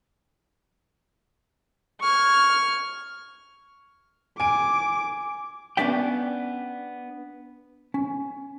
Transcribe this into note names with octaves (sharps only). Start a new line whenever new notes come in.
C#6 F6 G#6
G#5 D6 D7
B3 C#4 D4 D5 E5 G5
C#4